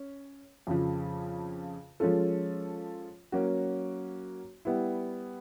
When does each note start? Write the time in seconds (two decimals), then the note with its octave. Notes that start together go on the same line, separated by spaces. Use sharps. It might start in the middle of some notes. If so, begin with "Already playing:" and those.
Already playing: C#4
0.67 F2 C#3 F3
2.00 F3 G#3 C#4 F4 A4
3.32 F#3 A#3 C#4 F#4
4.65 G3 B3 E4